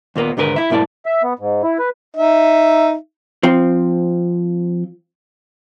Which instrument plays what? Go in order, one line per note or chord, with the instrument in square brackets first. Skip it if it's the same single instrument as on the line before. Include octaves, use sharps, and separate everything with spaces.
[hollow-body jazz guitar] D#2 A#2 A#3 B3
D#2 G#2 D3 A#4 B4
E4 E5
B1 G#2 A#3 E4 D5 A5
[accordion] E5
B3
G#2
E4
B4
[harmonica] D#4 E5
[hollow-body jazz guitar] F3 C4